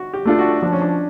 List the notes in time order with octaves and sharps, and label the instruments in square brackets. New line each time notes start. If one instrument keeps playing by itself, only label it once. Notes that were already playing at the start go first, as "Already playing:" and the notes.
Already playing: [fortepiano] F#4
G4
[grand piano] A3 D4 F4 A4
[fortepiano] F#4
[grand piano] F3 [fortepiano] D4
[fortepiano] C#4
D4